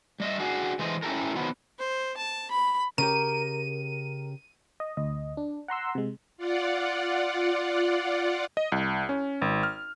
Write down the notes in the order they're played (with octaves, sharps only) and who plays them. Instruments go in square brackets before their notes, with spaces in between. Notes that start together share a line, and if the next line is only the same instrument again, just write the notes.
[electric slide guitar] G3 D#5 E5
D4 F#4 G#4
E3 G#3 A3 C5 D#5
C#4 E4 F#4 G4 A4 A#4
D#3 F3 F#3 B3
[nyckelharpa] C5
A5
B5
[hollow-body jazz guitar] C#3 C#4 G4 [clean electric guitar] A#4 [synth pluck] D#7
[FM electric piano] D#5
D2 D#5
D4
F#5 A#5 C6 E6
C3 G#3
[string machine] F4 D5 F#5
[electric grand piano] D#5
C2
C#4
G#1
F6